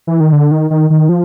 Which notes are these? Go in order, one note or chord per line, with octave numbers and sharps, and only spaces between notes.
E3
D#3
D3
D#3
D#3
D#3
F3